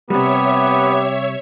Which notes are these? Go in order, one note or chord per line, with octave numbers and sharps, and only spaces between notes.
C3 G3 B3 G4 C#5 E5